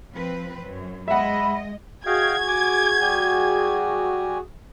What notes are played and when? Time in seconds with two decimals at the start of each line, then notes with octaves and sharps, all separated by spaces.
0.14 F3 C4 B4
0.63 F#2
1.08 G#3 D#5 E5 F#5 B5
2.06 F#4 G#4 D#5 F5 G5 G#6
2.47 G#5 D6
3.01 G3 G#5